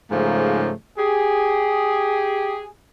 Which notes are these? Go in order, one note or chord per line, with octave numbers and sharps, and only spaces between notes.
G#2 C#3 F3 A3 A#3
G4 G#4